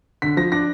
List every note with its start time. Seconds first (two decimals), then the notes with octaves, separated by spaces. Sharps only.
0.22 D3 B6
0.37 F3 A#6
0.52 D4 A#6